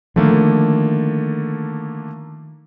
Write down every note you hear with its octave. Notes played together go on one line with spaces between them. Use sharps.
D3 D#3 F3 A3 A#3